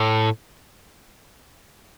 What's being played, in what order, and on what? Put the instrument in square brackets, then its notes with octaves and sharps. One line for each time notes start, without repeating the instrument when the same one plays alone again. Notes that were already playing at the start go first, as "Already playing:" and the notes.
Already playing: [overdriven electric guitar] A2